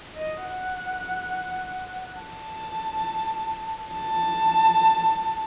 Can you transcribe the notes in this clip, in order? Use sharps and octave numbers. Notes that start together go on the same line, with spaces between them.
D#5
F#5
A5
A5